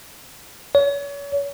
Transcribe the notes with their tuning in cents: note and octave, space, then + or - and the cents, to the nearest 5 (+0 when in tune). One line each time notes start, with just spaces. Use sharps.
C#5 +35